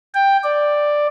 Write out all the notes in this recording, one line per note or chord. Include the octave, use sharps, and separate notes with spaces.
G5
D5